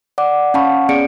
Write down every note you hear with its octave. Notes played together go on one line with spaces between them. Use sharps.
D5 F#5 D6
C#4 F5 F#5 A5 B5 C#6
B3 C#4 G#4 D5 C#7 D7